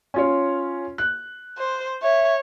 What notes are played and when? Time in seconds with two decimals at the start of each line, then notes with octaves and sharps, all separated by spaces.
0.14 C#4 F4 C#5
0.98 F#6
1.58 C5
2.02 C#5 E5